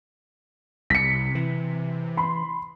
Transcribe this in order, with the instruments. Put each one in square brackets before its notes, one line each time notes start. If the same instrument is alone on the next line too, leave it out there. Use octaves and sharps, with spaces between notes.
[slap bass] C2 [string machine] C3 [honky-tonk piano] B6 C#7
[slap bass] E3
[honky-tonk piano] B5 C6